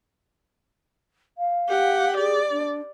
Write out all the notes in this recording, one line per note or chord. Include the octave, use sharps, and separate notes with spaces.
F5
G4 F#5
G#4 D5
D4